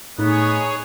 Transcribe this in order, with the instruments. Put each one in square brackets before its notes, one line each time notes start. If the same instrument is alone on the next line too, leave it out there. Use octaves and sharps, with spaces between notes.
[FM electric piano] A2 A3 [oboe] B3 [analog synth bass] D#4 [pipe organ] G#4 C#5